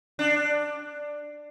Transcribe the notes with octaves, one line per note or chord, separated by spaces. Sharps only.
D4